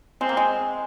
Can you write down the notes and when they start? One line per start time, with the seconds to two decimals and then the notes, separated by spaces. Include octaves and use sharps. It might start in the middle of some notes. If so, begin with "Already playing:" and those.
0.21 G#3 C4
0.29 A#3
0.37 G#3